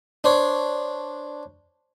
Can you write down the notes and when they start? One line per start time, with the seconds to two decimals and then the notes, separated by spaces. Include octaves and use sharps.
0.24 D4 C5 C#5